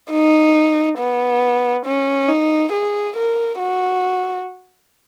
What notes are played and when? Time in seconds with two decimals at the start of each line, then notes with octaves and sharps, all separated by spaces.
0.11 D#4
0.98 B3
1.86 C#4
2.28 D#4
2.72 G#4
3.17 A#4
3.59 F#4